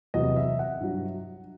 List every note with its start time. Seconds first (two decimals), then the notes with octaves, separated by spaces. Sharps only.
0.14 E2 C3 F#3 D#5
0.36 E5
0.59 F#5
0.80 G2 F#3